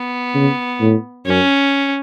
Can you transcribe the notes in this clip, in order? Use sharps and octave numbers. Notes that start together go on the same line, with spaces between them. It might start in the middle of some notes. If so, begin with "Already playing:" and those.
Already playing: B3
C#3
A2
F#2 C#4